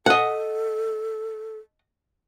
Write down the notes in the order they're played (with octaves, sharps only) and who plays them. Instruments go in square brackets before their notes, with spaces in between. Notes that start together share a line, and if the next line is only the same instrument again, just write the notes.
[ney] A4 [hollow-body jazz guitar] D#5 F#5